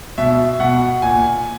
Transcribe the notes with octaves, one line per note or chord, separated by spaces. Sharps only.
B2 E5
B2 F#5
A#2 G#5